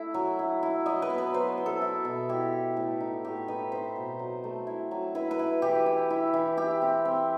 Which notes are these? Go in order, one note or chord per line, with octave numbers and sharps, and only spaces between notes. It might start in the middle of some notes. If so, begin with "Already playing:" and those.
Already playing: A3 E4
F#3
E4
E4
F#3 D#5
B4
B3
B4
F#3 C5
B3
A4
E4
B2
E4 G4
E4
A2
D#4
A2 G4
D#4 B4
C4 C5
B2
F#3
A3
E4
F#3
E4 B4
B4
E4
E3 G4
E4
E4
E3
E4 G4
C4
C4